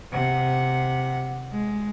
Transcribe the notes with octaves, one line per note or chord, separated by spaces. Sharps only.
C3 F#5
G#3